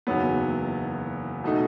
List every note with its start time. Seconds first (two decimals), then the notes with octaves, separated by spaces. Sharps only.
0.07 F#1 E2 D#3 F#3 B3
1.44 B2 A3 D#4